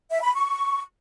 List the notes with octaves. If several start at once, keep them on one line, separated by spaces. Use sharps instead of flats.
E5
B5
C#6